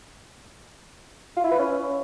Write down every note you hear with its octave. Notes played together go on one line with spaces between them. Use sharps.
F4
E4
B4
C#4